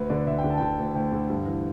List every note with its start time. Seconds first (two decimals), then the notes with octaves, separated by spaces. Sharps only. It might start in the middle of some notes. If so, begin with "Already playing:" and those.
Already playing: D2 B4
0.09 D3 D5
0.27 D2 E5
0.38 G5
0.44 D3
0.50 A5
0.58 G5
0.61 D3 A5
0.78 D2
0.95 D2 G5
1.12 D3
1.30 G2
1.46 E3